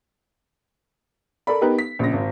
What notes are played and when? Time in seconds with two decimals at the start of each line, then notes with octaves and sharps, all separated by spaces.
1.47 A4 A#4 D5 B5
1.61 B3 D#4 G4 A#4 B4
1.79 B6
1.99 A#1 C#3 A#6
2.13 G#1